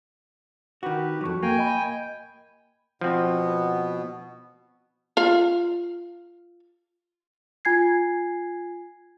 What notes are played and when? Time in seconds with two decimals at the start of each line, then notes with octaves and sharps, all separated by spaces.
0.83 D#3 F#4 G4 B4
1.21 F2 F#3 F#4 C#6
1.43 A#3 G5 G#5
1.59 D#5 B5
3.01 B2 F3 B3 C4
5.17 F4 F5
7.65 F4 G#5 G#6 C7